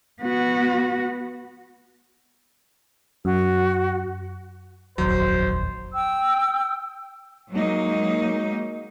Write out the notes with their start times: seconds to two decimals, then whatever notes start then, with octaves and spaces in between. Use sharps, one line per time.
0.22 B3 F#4
3.25 F#2 F#4
4.98 F1 A#1 D#2 F#3 C5
5.93 G5 E6
7.52 F#3 G#3 A#3 D#4